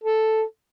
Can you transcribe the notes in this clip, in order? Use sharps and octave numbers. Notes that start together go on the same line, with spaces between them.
A4